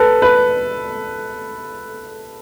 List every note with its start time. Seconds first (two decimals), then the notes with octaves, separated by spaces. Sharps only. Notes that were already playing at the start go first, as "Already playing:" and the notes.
Already playing: A4 B4
0.22 B4